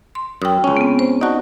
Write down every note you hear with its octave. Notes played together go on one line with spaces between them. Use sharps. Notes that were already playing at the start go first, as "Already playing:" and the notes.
C6
F#2 G5 D#6
C#2 C#4
B3 C4
C5
D#4 F#4 D5 A5